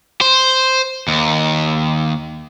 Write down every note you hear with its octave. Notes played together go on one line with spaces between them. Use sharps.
C5
D#2